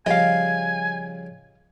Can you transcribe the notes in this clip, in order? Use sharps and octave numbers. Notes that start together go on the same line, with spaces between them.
C#3 F3 G3 D#5 F5 G#5